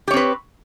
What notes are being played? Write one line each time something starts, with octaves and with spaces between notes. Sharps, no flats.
C4 G4 B4 C#5